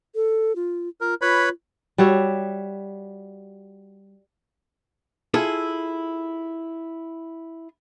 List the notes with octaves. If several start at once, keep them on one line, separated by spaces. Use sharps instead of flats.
A4
F4
F4 A#4
F4 B4 C#5 B5
G3 F#4 C#5 E5
E4 F4 G#4 A4